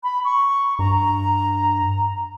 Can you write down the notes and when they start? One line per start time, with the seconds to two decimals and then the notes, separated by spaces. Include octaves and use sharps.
0.03 B5
0.25 C#6
0.79 G2 A#5